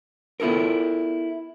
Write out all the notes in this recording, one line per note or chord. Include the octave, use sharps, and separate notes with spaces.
B3 E4 F4 A4 A#4